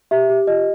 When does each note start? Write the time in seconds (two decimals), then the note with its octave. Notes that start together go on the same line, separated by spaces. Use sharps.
0.11 G4 E5
0.30 G4
0.47 F4 D#5